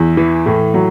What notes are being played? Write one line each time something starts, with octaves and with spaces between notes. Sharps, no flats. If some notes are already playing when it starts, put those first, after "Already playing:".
Already playing: E2 E4
E3
A2
F#3